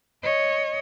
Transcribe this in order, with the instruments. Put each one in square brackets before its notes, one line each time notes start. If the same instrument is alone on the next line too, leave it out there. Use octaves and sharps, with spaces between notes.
[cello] C#5 D#5